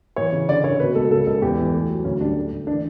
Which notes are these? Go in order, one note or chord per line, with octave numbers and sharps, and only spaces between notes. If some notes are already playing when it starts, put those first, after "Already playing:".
E3 C#5
C#3
D3 D5
D3 C#5
B2 B4
C#2 A4
C#3 A4
C#2 A4
E2 G4
E3
A3
F#3
D2 C#4
G3 D4
A3
D2
E3 D4